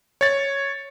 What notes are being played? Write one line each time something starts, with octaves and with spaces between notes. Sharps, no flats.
C#5 A6